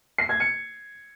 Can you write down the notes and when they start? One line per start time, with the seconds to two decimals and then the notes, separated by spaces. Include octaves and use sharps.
0.18 C7
0.29 G#6
0.40 C#7